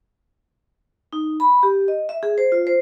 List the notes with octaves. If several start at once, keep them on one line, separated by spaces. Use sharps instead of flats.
D#4
B5
G4
D#5
E5
G#4
C5
F4
C5